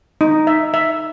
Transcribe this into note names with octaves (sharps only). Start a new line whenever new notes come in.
D#4
E5
E5